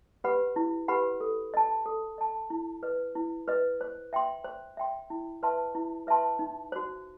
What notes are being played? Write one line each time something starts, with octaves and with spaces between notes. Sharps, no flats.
G4 B4 F#5 B5
E4
G4 B4 F#5 B5
A4
D#5 A5
A4
D#5 A5
E4
B4 D#5
E4
B4 D#5
C5
E5 G5 C6
C5
E5 G5 C6
E4
B4 E5 A5 C6
E4
B4 E5 A5 C6
D#4
F#4 C5